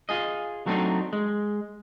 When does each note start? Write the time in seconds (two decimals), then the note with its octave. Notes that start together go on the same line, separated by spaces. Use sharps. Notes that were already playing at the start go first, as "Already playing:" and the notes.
0.09 F4 G#4 D#5
0.66 F#3 A3 C4 D4 D#4
1.13 G#3